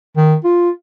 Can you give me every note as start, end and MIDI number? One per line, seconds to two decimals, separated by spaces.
0.17 0.35 51
0.44 0.70 65